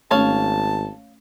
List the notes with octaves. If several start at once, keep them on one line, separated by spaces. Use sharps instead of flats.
G#1 A3 C#4 C#5 F5 A5